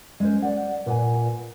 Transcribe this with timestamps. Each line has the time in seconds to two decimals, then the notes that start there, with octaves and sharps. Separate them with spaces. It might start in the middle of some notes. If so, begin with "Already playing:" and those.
0.20 G#3 C#4 C5
0.42 D5 F#5
0.86 A#2 B4 F#5 G#5